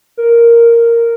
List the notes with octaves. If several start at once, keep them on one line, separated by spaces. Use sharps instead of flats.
A#4